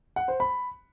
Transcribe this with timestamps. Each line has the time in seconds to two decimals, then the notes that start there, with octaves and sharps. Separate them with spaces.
0.16 F#5
0.28 C5
0.40 B5